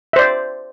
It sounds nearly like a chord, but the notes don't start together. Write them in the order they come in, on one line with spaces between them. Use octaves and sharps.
E5 C5 D5